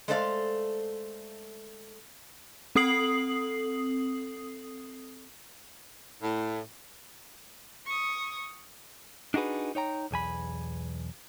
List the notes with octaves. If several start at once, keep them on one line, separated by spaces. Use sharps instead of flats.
G#3 A3 A4 C5 D5 F5
C4 A4 D#6 C7 F#7
A2
C#6 D#6
D4 D#4 F#4 G#4 B4
D#4 C#5 G5 A#5
B1 E2 G#5 B5